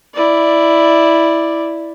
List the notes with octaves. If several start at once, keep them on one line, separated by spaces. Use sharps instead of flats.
E4 D5